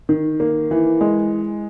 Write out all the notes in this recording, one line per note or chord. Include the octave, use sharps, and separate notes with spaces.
D#3
A#3
E3
G#3